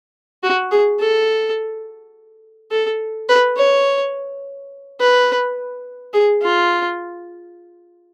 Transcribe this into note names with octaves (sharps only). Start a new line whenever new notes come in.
F#4
G#4
A4
A4
B4
C#5
B4
G#4
F4